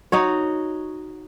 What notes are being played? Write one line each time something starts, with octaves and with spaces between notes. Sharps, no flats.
D#4 F#4 C#5